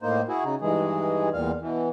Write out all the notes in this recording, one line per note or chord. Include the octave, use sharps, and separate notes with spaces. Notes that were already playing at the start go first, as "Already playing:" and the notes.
A2 A#3 D#4 C5
E4 F#4 G#4
C#3 D#4
G2 D#3 E3 G#3 G#4
E2 A#2 G3 F5
B2 E3